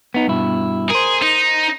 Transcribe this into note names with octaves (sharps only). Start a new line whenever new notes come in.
B3 D#4
G2 B2 E4
G#4 A#4 C5
D#4